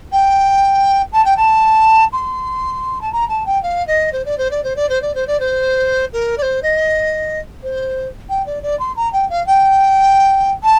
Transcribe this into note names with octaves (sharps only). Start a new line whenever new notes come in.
G5
A5
G5
A5
C6
A5
A#5
A5
G5
F5
D#5
C5
D5
C5
D5
C5
D5
C5
D5
C5
D5
C5
A#4
D5
C5
D#5
C5
G5
D5
D5
C6
A#5
G5
F5
G5
A5